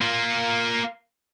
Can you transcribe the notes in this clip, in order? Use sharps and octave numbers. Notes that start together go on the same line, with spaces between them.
A#3 F4